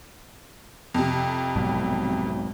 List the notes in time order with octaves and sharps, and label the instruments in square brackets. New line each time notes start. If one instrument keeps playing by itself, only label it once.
[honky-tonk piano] F2 C3
[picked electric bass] B1 G#2 B2